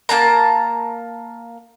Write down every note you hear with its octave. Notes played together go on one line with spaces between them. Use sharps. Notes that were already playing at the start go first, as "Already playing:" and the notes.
A#3 C4 A5 A#5